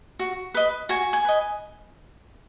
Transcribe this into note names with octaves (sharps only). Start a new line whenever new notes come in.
F#4
B4 D#5
F#4 G#5
G#5
B4 D#5